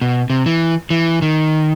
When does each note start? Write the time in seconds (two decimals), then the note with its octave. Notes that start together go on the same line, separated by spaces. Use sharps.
0.02 B2
0.30 C3
0.46 E3
0.90 E3
1.22 D#3